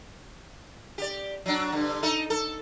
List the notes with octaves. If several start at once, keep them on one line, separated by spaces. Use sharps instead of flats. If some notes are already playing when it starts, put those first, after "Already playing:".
G4 D5
F#3 D4
G2 D3
D#4 A4
A4